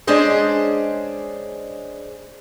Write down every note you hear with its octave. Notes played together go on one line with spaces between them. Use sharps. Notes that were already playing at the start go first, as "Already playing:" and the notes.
G#3 C#4 D4 G#4 C5 D#5